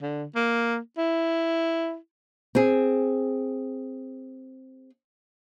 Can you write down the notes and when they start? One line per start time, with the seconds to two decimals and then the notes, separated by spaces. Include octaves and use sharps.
0.01 D3
0.35 A#3
0.97 E4
2.55 C4 G#4